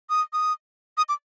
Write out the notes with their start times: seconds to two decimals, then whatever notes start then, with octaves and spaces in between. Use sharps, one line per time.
0.10 D#6
0.33 D#6
0.97 D#6
1.09 D6